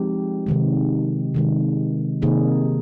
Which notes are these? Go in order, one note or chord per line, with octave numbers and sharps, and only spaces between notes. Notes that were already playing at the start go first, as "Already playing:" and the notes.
Already playing: F3 G#3 C4 D#4 G4
C3 D#3 G#3
C3 D#3 G#3
C3 D#3 A#3 D#4 G#4